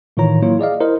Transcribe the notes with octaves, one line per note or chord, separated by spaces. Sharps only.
A2 D#3 E3 F4 C#5 A#5
F#3 A#3 E4 F4 C#5
G#4 D5 D#5 F5
E4 A#4 C5 D#5